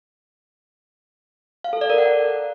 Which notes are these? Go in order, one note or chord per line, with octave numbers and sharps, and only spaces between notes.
F5
A4
D5
A#4
F#5